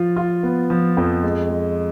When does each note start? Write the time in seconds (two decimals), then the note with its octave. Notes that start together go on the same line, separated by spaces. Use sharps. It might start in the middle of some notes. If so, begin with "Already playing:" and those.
Already playing: F3 F4
0.16 F4
0.43 B3
0.70 F3
0.97 F2
1.23 G#3
1.50 G#3